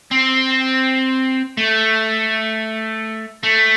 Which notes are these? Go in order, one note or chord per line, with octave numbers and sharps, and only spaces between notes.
C4
A3
A3